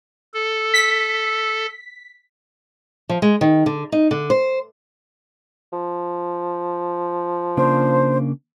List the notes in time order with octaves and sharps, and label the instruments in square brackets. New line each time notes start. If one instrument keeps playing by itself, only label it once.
[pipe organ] A4
[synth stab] B6
[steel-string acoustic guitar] F3
G#3
D#3
D3
D#4
D3
C5
[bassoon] F3
[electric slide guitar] C#3 A#3 D4 [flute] C5